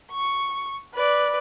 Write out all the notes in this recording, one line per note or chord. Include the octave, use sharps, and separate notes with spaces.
C#6
B4 D5